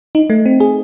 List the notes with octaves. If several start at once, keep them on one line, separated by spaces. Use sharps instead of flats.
D#4
A3
C4
G#4